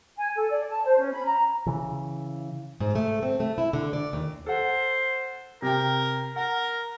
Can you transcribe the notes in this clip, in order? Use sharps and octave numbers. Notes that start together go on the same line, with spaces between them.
G#5
A4
D5
A5
C5
C#4
B5
A#5
C#3 E3
G#2
A3
C4
A3
E4
D3
D5
D#2
A4 C5 F#5
C3 A#4 G5
A#4 F#5